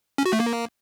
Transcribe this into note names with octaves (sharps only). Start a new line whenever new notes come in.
C#4
F#4
A3
A#3